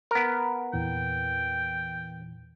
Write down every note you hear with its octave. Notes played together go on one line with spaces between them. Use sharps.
B3 A#4
E2 A#2 E3 G5